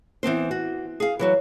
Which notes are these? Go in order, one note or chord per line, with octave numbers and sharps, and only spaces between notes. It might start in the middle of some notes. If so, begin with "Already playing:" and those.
E3 B3 C4 C5
F#4
G#4 F5
E3 F#3 F#4